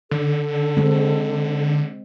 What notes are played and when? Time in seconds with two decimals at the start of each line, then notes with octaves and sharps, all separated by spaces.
0.11 D3 A4
0.77 G#3 C4